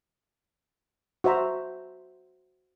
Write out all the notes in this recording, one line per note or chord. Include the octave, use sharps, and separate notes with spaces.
F#4 C5 E5 A#5